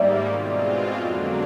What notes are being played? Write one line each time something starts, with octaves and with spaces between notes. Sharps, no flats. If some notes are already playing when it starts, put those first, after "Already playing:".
Already playing: G#2 D#3 G3 A#3 D5 E5
B2 G#3 C4 F4
F2 D3 F#3 A#3 D4